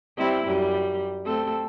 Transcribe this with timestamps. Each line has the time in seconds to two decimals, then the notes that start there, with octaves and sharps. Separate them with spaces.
0.17 G3 C4 E4
0.46 F#2 G3
1.25 A3 C4 A4